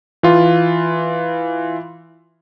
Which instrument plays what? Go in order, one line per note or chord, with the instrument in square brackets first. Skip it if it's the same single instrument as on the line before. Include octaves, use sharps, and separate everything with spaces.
[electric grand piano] E3 F4